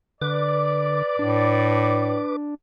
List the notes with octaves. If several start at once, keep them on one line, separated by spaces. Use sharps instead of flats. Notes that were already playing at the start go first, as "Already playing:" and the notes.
D3 B4 D5 D6
A2 D4